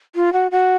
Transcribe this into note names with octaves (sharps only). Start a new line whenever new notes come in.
F4
F#4
F#4